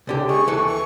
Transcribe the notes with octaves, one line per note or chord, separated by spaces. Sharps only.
C#2 D3 G4
G#3 C#6
D#2 E3 A4
C#6